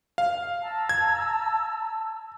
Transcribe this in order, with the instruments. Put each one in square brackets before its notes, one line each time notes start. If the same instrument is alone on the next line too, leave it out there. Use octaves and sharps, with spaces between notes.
[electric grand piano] F5
[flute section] A5 A#5 E6
[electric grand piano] G#6